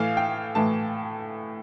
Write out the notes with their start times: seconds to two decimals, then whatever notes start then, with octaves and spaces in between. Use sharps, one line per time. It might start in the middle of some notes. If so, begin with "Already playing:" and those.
Already playing: A2 E3 A3 F5
0.17 G5
0.55 A2 E3 A3 A5